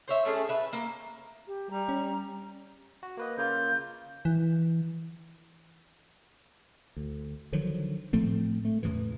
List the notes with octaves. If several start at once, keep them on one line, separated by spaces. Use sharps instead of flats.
C5 C#5 E5
A3 C#4 D#4 G#4
B4 E5
A#3
G4
G3 A#5
C#4
F#4
A#3 B4 D#5
C#3 A#3 F4 G6
E3
D2
D3 D#3 F3 F#3
A2 F3 A3 C4
A3
E2 A2 C#3 E3